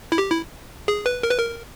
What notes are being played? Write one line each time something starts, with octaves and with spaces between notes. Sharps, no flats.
E4
G4
E4
G#4
B4
A#4
B4
A#4